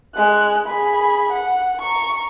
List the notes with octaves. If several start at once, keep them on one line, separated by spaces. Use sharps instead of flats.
G#3 F#6
G#4 B5
F#5
A#5 C#6